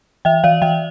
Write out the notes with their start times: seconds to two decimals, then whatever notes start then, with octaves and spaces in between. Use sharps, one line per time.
0.25 E3 E5 G5
0.44 E3 D5 F5
0.62 E3 E5 G5